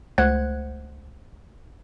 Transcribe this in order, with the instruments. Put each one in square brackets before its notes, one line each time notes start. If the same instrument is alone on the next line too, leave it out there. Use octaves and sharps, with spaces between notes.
[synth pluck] C#2 A3 C5 F#5 F#6 G#6